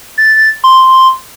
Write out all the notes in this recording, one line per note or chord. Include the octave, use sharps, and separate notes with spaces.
A6
C6